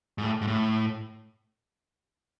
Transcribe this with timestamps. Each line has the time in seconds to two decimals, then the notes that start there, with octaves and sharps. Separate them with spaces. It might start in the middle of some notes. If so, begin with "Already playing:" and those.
0.18 G#2
0.23 A2
0.41 G#2
0.47 A2